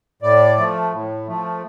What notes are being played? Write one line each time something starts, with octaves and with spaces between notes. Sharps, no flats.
A2 D5
F3 A3
A2
F3 A3